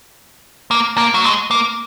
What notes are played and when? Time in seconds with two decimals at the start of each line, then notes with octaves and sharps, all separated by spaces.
0.71 A#3
0.97 A#3
1.14 F#3
1.24 G#3
1.51 A#3